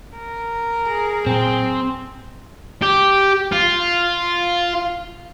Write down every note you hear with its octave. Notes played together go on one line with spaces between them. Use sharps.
A#4
G#4
A#2 F#3 C4
G4
F4